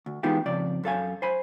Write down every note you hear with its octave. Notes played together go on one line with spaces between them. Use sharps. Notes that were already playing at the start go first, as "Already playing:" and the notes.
D2
E3 G#3 B3 D#4 F4 G4
F2 C#3 D5
F#2 A4 F5 G#5
C5 G#5 B5